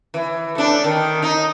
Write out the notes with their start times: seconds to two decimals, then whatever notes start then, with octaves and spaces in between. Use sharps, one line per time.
0.14 E3
0.55 A3 D4
0.84 D#3
1.22 D#4